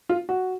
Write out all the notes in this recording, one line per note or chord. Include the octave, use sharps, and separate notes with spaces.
F4
F#4